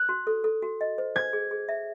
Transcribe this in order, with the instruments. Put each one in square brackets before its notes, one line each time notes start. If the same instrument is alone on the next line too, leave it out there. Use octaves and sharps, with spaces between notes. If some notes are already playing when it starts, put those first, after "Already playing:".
Already playing: [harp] F#6
[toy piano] F#4
A4
A4
F#4
D#5
C5
[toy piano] C5 [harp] G#6
[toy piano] G#4
G#4
E5